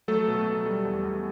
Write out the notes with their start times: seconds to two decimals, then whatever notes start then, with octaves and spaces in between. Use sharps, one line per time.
0.08 F#3 A3 A4
0.28 B2
0.47 B2
0.66 G3
0.85 E2
1.05 E2